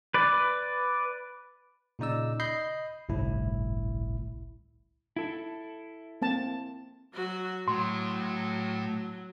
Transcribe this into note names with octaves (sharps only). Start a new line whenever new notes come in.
B4 D5
A#2 C#3 D#4 D5 E6
D#5 B5 G6 C7
G1 C2 A2 E4
E4 A4
A#3 C4 A5
F#3 F#4
A2 F#3 C6